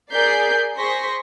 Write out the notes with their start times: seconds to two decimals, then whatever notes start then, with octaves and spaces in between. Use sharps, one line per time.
0.13 G#4 A#4 D5 G6 B6 C7
0.76 G#4 C5 C6 C#6 A#6 B6